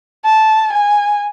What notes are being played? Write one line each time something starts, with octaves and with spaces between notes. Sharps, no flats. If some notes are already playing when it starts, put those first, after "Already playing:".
A5
G#5